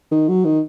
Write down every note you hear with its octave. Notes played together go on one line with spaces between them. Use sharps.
D#3
F#3
D#3